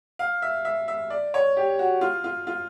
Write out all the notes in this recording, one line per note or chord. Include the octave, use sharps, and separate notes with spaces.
F5
E5
E5
E5
D5
C#5
G4
F#4
F4
F4
F4